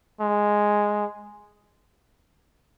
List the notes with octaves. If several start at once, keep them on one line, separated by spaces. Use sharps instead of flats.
G#3